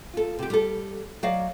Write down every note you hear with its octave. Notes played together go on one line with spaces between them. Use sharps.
F4 A4
C3 G4
G3 A4
F#3 D5 D#5 F5